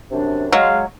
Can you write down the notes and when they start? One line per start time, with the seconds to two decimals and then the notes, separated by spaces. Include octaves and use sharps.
0.11 F#2 C3 D4
0.52 F#3 G#3 F5